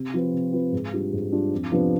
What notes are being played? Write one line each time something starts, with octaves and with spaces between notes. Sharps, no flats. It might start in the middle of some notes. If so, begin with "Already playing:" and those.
Already playing: C3
F3 C4 F4 B4
C3
F3 C4 F4 B4
G#2
G3 D4 F4
G#2
G3 D4 F4
F2
C3 F3 B3 D4